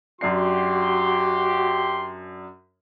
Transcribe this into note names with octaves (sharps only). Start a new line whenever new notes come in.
F#2 D4 F#4 G4 C6 C7